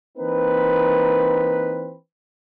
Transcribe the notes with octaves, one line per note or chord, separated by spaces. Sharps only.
E3 A#3 C4 D#4 B4